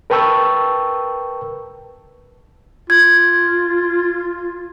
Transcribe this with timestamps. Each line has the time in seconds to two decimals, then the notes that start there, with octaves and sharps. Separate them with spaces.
0.10 A#4 B4 G5 A5 C#6 E6
2.90 F4 G#6